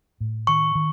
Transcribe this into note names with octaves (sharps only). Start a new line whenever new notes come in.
A2
D#3 C#6
D#3